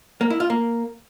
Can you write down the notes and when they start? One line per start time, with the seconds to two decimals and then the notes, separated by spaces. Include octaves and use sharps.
0.21 A#3
0.30 E4
0.40 F4
0.50 A#3